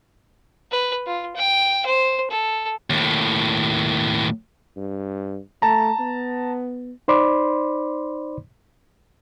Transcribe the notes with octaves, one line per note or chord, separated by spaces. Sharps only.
B4
F4
G5
C5
A4
D#2 A2
G2
A3 A5 A#5
B3
D#4 C5 D5 B5 C6 D6